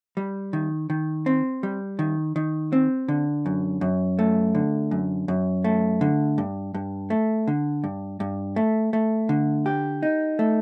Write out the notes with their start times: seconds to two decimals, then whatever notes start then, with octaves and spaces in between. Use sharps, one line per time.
0.17 G3
0.53 D#3
0.90 D#3
1.26 C4
1.63 G3
1.99 D#3
2.36 D#3
2.73 C4
3.08 D3
3.46 F#2
3.81 F#2
4.19 A3
4.55 D3
4.91 F#2
5.28 F#2
5.64 A3
6.01 D3
6.38 G2
6.74 G2
7.10 A3
7.48 D3
7.84 G2
8.20 G2
8.56 A3
8.93 A3
9.29 D3
9.66 G4
10.03 D#4
10.39 A3